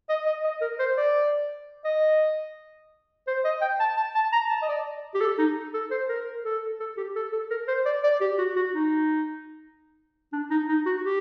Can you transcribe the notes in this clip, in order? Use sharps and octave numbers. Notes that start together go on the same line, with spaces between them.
D#5
D#5
D#5
A#4
C5
D5
D#5
C5
D#5
G5
A5
A5
A5
A#5
A5
D#5
D5
G4
A4
D#4
A4
C5
A#4
A4
A4
G4
A4
A4
A#4
C5
D5
D5
G4
F#4
F#4
D#4
D4
D#4
D#4
F#4
G4